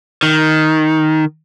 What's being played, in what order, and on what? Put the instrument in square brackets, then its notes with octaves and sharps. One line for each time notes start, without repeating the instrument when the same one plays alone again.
[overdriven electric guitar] D#3